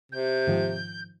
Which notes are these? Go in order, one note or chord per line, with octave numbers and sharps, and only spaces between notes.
C3 G6
G#2 D#3 F3